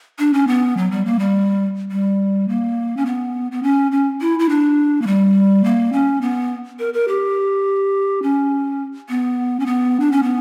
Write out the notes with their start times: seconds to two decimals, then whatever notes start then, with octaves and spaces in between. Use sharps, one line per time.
0.19 D4
0.33 C#4
0.47 B3
0.77 F#3
0.91 G3
1.05 A#3
1.19 G3
1.91 G3
2.48 A#3
2.97 C#4
3.06 B3
3.52 B3
3.63 C#4
3.92 C#4
4.21 E4
4.39 E4
4.49 D4
5.02 A#3
5.07 G3
5.64 A#3
5.93 C#4
6.21 B3
6.79 A#4
6.94 A#4
7.08 G4
8.23 C#4
9.09 B3
9.60 C#4
9.66 B3
10.00 D4
10.12 C#4
10.23 B3